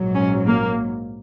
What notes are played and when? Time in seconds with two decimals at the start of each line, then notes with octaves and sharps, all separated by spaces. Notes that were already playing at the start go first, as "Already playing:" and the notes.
Already playing: A#1 G#2 F#3
0.14 C#4
0.45 A#3